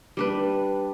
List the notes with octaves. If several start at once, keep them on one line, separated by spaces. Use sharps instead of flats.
G3 D4 B4